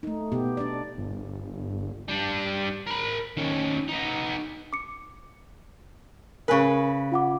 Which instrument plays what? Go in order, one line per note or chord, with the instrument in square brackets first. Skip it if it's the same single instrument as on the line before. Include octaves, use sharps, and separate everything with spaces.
[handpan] A3 D#4
B2 B3 G4
D4 D5
[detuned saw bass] G1
[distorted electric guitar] G3 D4
A#4 B5
D#3 C#4
B3 D#4
[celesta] D6 C#7
[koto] C#3 B4 [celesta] A#4 G#5
[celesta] F4 F#5 D6